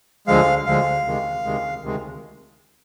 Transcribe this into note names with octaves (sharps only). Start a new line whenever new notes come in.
D2 D3 F3 G#3 F5
D2 D3 F3 G#3 F5
D2 C3 D#3 G#3
D2 C3 D#3 G#3
D2 C3 D#3 G#3